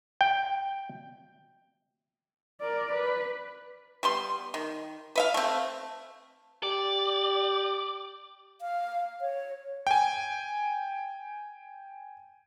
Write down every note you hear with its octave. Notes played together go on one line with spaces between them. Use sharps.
G5
A#4 D5
B4
G3 B3 C6
D#3
B4 E5 F5
A3 C4
G4 D5
F5
C#5
G5 G#5